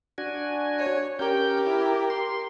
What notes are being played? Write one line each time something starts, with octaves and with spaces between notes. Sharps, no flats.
D4 F#4 G#5
C#5
C#4 G4 A#4 G6
E4
C6